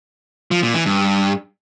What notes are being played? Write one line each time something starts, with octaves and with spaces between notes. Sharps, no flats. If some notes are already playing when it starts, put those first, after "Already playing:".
F3
A#2
E3
G2